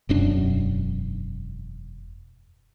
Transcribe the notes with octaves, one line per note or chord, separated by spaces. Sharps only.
E1 F#2 D4